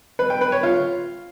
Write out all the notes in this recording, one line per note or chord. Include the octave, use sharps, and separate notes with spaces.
B4
G5
B4
C#5
F4